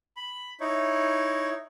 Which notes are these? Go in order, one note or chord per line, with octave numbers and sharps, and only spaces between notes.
B5
D#4 E4 C#5